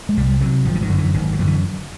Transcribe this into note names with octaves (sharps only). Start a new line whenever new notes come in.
G#3
C2 G3
C3 F#3
G#1 F3
D3
D#3
F#2 D3
E3
G#1 D#3
F#3
F#2 D3 F3
E3